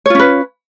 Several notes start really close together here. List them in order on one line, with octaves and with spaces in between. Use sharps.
C#5 F4 C#4 B4